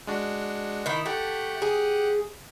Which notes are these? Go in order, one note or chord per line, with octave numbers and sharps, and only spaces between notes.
G#3 D4 F#4
D#3 E4
A3 G4 F#5
G#4